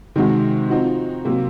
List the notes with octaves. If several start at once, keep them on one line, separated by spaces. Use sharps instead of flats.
C3 D#3 G#3 D#4 F#4
F3 C4 D#4 F#4
C3 F#3 A#3